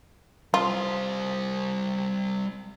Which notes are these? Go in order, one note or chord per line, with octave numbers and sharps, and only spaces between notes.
G3 F4 C5